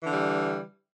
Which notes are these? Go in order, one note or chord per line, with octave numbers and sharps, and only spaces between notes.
D3 E3 G3